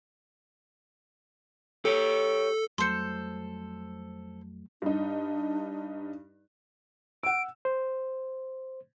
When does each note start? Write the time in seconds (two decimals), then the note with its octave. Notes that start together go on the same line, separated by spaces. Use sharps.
1.85 G4 A4 C#5
2.78 F2 F#3 G3 A3 A4 C5 C6 C#7
4.82 G2 D4 D#4
7.23 F#5 E6 D7
7.65 C5